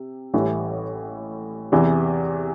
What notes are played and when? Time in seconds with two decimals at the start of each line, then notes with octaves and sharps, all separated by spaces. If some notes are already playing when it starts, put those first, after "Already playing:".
Already playing: C3
0.34 A1 A2 E3 G3
1.72 E2 C3 E3